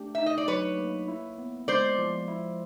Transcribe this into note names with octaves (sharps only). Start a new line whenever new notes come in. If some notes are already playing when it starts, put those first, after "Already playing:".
Already playing: A3 D4 G4
D#4 E5
D#5
D5
F#3 B4 C#5
A#3
E4
B3
G#3 C5 D5
F3
E4